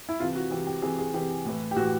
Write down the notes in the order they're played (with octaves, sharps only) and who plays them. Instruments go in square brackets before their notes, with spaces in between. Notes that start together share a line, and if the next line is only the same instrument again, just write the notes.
[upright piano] E4
C3 E3 F4
F#4
E3 G4
C3
G4
C3 E3 G#4
G#4
C3 E3 G4
A2 E3
G4
A2 E3 F#4